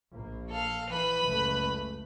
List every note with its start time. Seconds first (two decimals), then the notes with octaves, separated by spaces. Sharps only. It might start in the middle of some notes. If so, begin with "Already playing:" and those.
0.11 A#1 A#3
0.50 A4 F5
0.90 E3 B4 B5
1.25 F#1 C#2 A3